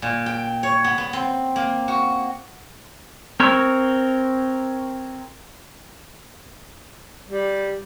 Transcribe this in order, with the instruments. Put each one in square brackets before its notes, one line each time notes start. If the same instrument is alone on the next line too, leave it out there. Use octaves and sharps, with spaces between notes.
[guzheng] A#2
G5
C#5
B3
B3
C4
A#3
F#4
[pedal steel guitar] C4 A#4 C#5
[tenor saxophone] G3